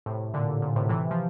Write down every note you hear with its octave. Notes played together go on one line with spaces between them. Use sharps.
A2 C3
A#2 D3
A#2
A2 C3
C3 E3
F3